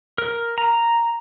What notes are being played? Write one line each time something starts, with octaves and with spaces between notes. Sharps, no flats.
A#4
A#5